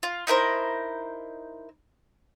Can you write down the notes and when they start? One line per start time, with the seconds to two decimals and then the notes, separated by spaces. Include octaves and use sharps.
0.03 F4
0.27 D#4 E4 A#4 C5